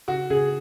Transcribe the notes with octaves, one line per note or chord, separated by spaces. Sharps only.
C#3 F#4
C#3 G#4